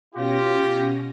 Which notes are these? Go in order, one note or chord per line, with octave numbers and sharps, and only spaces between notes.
B2 C#4 F4 G4 A#6